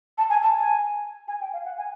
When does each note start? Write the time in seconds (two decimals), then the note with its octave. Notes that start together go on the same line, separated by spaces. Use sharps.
0.18 A5
0.29 G#5
0.42 A5
0.60 G#5
1.27 G#5
1.40 G5
1.53 F5
1.64 F#5
1.77 G#5